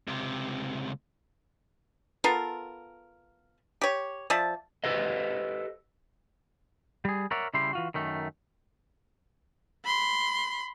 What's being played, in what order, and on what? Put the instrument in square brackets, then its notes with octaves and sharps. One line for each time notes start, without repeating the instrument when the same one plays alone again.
[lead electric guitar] C#2 C3
[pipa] B3 F4 A4 A#4
G4 C#5
F3 D5 E5 A5
[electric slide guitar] G4 A4 B4 C5 D#5
[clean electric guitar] G3 G#4
A#4 C#5 D5 E5 F#5
C#3 G3 E4 G4 C6
E3 F4 F#4
F#2 D#3 A3
[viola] B5 C6